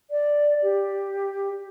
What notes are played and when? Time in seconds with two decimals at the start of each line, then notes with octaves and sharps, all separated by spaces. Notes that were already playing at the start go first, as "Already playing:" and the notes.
0.11 D5
0.63 G4